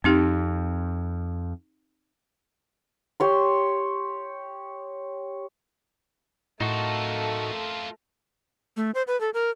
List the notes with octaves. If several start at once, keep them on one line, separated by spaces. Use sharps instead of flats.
F2 C4 D#4 G4
G4 C#5 C6
A2 A3 D#4 F4 F#4 A4 A#4
A3
C5
B4
A4
A#4